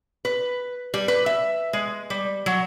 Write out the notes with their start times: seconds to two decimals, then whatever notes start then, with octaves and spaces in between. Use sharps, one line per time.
0.25 B4
0.94 G3
1.08 B4
1.26 E5
1.73 G#3
2.10 G3
2.46 F#3